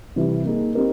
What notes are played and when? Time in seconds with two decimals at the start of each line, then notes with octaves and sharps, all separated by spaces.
0.16 C3 E3 G3
0.45 A#3 D#4 G#4
0.75 C4 D#4 G4 A#4